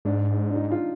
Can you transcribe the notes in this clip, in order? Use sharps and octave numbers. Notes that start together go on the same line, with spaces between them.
G#2 D4
D4
D#4
F4